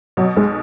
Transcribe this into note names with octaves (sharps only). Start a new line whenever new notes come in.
B2 F#3
B1 G#3